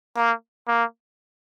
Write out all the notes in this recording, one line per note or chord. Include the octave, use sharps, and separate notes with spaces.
A#3
A#3